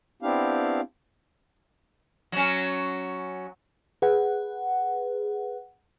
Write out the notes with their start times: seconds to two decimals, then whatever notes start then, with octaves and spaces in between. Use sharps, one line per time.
0.22 B3 C4 D4 E4 G4 F5
2.32 F#3 C#4
4.02 G#4 B4 F#5